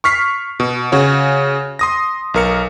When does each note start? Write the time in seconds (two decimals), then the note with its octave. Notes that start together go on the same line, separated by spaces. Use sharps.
0.04 C#6 F6 B6 C7
0.60 B2
0.92 C#3 F#4 C#5
1.79 C6 D#6 A#6
2.34 B1 A#4 C#7